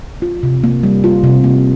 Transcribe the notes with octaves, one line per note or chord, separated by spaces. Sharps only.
F4
C3
A#3
G3
F4
C3
A#3